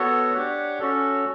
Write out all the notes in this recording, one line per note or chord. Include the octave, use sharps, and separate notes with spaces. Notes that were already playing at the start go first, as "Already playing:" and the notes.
Already playing: B3 F#4 A4 C#5
D4 G4 C#5 F#5
C#4 F#4 A4